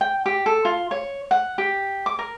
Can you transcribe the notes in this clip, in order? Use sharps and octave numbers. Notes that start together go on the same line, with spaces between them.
G5
G4
A4
F4
C#5
F#5
G4
D6
A#4